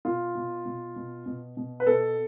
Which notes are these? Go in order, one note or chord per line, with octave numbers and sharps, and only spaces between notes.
B2 F4
B2
B2
B2
B2
B2
B4
B2 A4